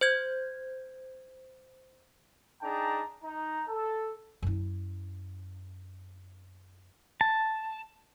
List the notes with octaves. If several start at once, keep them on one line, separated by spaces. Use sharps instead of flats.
C5 G6 G#6
D4 D#4 G#4 G5 A5 A#5
D#4 A#5
A4
F#2 E4
A5